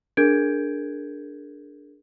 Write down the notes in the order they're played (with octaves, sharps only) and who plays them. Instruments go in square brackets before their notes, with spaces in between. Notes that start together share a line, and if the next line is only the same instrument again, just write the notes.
[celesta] D4 G#4 A#4 G6 G#6 D7